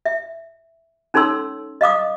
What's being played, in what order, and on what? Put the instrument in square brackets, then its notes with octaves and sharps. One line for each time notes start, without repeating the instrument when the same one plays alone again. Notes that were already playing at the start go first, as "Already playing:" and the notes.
[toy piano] E5
C#4 D#4 A4 C#5 C6 E6
D#5 F5 D6 D#6